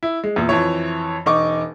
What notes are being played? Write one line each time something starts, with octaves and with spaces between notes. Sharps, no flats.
E4
G#3
E2 A#2
F2 E3 C#5
E1 D#4 C#6 D6